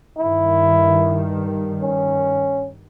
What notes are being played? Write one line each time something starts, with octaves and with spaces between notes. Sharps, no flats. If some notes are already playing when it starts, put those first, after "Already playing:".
G2 D#3 E4
C#4